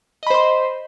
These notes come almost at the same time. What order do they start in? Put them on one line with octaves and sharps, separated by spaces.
D#5 B5 C5 C6